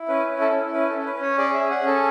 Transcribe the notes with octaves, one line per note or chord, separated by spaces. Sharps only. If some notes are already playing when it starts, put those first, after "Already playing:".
Already playing: E4
C#4 B4
E4
A4
C#4
C#4 B4
A4
C#4
B4
C#4
C#5
G#4 D5
E5
G#4
F#5
C#4
A4